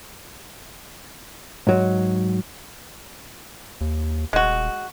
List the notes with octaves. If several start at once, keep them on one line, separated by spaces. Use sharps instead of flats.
G#2 F#3
D#2
D#1 G#3 F#4